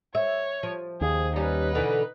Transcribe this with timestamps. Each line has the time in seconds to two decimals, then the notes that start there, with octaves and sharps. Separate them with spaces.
0.15 C#5 E5
0.63 F3
1.01 D#2 G#4
1.36 G3 C#4 D#4 B4
1.75 B2 D3 E3